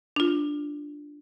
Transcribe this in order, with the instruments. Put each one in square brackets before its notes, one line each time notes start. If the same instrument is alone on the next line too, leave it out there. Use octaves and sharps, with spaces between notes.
[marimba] D4 F4